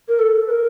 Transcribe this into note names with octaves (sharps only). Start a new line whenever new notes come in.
A#4
A4
B4
A#4